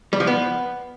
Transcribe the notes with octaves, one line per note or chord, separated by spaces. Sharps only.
G3
F3
B3